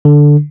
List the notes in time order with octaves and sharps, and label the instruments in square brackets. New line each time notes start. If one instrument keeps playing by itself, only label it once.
[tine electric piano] D3